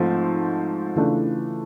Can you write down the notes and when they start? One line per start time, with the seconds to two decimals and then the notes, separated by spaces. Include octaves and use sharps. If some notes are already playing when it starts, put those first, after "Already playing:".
Already playing: G#2 F3 A3 C4
0.96 C#3 E3 A3 D4 F4